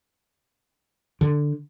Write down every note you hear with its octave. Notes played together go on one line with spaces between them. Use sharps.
D3